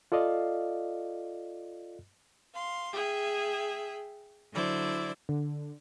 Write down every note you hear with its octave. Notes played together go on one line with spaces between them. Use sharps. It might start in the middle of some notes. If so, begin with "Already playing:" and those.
F4 A4 D5 D#5 F5
F5 C6
G#4 E5 G5
D3 F#3 E4 C5 D5
D3